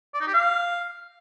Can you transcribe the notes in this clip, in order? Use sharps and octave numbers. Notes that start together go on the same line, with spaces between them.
D5
D#4
G4
F5